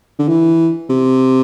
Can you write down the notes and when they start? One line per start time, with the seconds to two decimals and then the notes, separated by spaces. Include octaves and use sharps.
0.19 D3
0.28 E3
0.89 C3